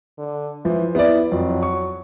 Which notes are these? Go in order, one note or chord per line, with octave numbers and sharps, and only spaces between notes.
D3
E3 F3
B3 E4 D5
F2 F#3
C#6